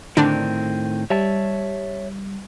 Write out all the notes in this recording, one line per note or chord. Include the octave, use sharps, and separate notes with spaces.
A2 D3 D#3 C4 D4
G3 C#5 E5 A5